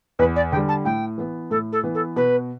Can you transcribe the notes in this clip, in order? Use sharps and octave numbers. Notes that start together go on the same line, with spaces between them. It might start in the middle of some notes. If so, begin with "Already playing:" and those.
E2 B4
D5
D3 G3 G5
A5
A2 G5
E3 B3
A2 A4
A4
E3 B3
A4
B2 B4